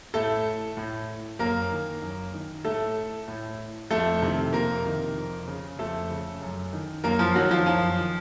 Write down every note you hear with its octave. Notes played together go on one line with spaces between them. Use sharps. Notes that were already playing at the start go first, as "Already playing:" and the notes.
A2 A3 A4
A2
F#2 A#3 A#4
D#3
F#2
D#3
A2 A3 A4
A2
F2 A3 A4
C3 D#3
F2 A#3 A#4
C3 D#3
F2
C#3
F2 A3 A4
C#3
F#2
D#3
F#2 A#3 A#4
F3 F4
D#3 F#3 F#4
F3 F4
F#2 F3 F4
D#3